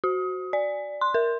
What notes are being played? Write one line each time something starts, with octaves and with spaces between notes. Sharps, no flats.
F#4
D5
C6
A#4